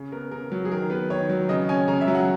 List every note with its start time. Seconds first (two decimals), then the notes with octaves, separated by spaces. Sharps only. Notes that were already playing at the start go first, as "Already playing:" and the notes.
Already playing: C#3
0.12 B3 A#4
0.32 C#3 A#4
0.52 F#3
0.65 G#4
0.72 D#3 A#4
0.90 B3 B4
1.10 D#3 C#5
1.29 F#3
1.49 C#3 D#5
1.69 C#4 G#5
1.88 C#3 A#5
2.01 E5
2.08 F#3
2.15 F#5